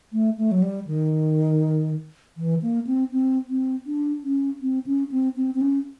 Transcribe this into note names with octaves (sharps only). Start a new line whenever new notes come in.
A3
A3
F#3
G3
D#3
E3
A#3
C4
C4
C4
D4
C#4
C4
C#4
C4
C4
C4
C#4